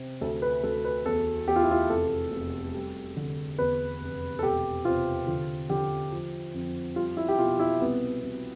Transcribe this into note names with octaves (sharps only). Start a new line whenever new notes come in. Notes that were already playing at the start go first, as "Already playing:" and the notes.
Already playing: C3
D2 A4
B4
D2 A4
B4
E2 A4
E2 G4
F4
E4
F4
F1 A4
F1
G3
D3
E2 B4
F1
A4
E1 G4
C3 F4
D3 F4
D3 G4
F3
F2
G3 F4
E4
G4
B2 F4
E4
C2 B3
C2